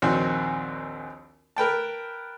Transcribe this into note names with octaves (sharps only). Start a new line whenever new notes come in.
A#1 D#2 C4 F#4 G#5
A#4 B4 G5 A5